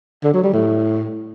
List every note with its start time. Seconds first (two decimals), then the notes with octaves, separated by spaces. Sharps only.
0.24 D3
0.34 F#3
0.43 G3
0.53 A2